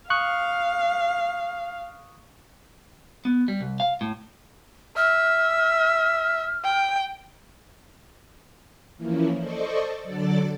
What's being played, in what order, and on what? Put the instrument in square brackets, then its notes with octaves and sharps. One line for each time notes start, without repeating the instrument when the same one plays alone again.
[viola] F5 [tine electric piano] C#6 D#6 F#6
[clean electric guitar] B3
G3
C2
F5
A2
[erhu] E5 [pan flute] F6
[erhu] G5
[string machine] E3 F3 A#3 C#4 E4
A4 C5 D5 D#5 C#6
D3 F#3 A4 D5 D6 A6